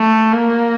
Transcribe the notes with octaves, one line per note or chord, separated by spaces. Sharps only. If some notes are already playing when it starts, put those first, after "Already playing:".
Already playing: A3
A#3